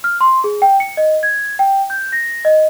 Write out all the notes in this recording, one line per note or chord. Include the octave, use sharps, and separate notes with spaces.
F6
C6
G#4
G5
C#7
D#5
G#6
G5
G6
A#6
D#5